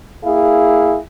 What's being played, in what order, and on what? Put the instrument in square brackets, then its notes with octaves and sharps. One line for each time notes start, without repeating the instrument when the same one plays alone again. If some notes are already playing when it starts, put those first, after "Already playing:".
[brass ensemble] A#3 E4 G#4 F5